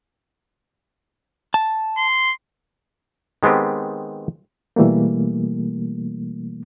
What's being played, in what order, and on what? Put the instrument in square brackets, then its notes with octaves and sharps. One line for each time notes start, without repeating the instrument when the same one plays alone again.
[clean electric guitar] A5
[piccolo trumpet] C6
[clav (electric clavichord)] D#3 G#3 B3 C4 G4
[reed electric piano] B2 E3 G3 A3 A#3